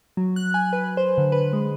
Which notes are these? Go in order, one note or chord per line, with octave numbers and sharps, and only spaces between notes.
F#3
F#6
G#5
B4
C5
D3
B4
G#3